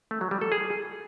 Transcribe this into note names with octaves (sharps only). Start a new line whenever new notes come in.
A3
F#3
G3
A4
G#4